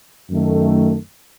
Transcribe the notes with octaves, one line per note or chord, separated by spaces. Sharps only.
F#2 D#3 A3